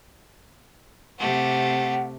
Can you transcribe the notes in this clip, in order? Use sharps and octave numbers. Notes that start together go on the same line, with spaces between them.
C3 A3 G4 F#5